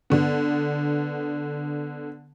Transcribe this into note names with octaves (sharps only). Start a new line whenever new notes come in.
D3 B3